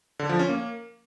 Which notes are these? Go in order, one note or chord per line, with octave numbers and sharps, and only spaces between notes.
D3
F3
C#4
A#3